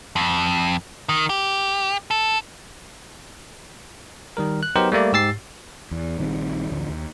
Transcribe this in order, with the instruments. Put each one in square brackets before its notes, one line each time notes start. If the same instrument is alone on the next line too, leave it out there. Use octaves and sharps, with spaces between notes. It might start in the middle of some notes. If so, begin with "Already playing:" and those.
[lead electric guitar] F2
D#3
G4
A4
[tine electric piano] D#3 G3 A#4
F#6
F#3 B3 D#4 G4 A#4 C5
G3 A3 A#3 D5
G#2 G4 E6 A6 C7
[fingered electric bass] E2
A#1 D#3 G3 C4
A1 D2 D3 F3
D#2